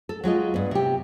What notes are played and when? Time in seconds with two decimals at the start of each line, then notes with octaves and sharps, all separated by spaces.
0.09 A4
0.24 F#3 G#3 F4 D#5
0.54 G2 B3
0.71 C3 G4